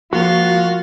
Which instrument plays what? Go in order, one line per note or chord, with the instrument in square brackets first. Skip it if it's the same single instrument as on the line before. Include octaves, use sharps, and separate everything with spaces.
[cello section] F3 G#3 [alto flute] A#3 [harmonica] F4 [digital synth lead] F#4